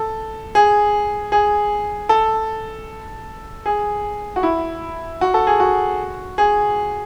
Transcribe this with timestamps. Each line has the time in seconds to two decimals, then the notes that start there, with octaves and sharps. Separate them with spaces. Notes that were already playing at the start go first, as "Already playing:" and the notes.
Already playing: A4
0.55 G#4
1.32 G#4
2.09 A4
3.66 G#4
4.36 F#4
4.43 E4
5.21 F#4
5.34 A4
5.47 G#4
5.60 F#4
6.38 G#4